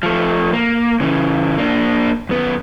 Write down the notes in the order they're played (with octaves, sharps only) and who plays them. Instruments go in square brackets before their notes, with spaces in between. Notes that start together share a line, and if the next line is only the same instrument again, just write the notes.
[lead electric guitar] F3 A3
A#3
C#3 E3
A#3 D4
F#2 B3